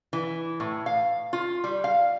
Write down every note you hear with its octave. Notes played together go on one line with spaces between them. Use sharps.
E3
A2
F5
F4
G3
F5